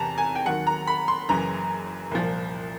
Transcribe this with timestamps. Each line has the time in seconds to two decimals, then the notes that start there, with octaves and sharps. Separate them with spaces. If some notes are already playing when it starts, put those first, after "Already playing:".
Already playing: E2 C3 E3 A5 A#5
0.18 G#5
0.35 G5
0.45 D#2 D#3 F#3 F#5
0.67 A#5
0.87 B5
1.08 C6
1.29 F#1 F#2 C#3 E3 A#5
2.11 C2 A#2 F3